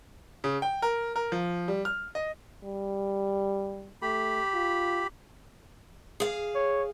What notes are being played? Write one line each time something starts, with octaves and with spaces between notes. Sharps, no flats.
C#3
G5
A#4
A#4
F3
G3
F6
D#5
G3
A3 G4 B5
F4
G#4 F5
C#5